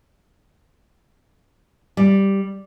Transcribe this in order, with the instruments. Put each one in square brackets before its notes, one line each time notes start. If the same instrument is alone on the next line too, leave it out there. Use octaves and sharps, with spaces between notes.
[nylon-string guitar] G3